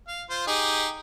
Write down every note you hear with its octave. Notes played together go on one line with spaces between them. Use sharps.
F5
F4 C5
D#4 G4 G#4